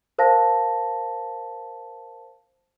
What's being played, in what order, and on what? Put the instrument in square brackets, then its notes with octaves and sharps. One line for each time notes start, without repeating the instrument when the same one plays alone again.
[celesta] A#4 C5 F5 A5 A#6